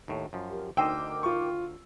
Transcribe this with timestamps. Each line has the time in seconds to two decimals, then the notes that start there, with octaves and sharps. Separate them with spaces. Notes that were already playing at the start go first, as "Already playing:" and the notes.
0.08 D#2 A2
0.33 F#2 F3
0.50 G4 A#4
0.77 D2 D#4 A#4 C5 D#5 G5 D6 E6
1.23 F4 C#6